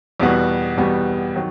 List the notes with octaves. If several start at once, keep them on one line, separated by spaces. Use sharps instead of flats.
E2 B2 G3 B3 F#4
E2 B2 G3 B3 F#4
D#3 F#3